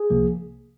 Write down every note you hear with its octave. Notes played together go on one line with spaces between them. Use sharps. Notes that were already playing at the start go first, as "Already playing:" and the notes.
Already playing: G#4
C2 C3 F3 A#3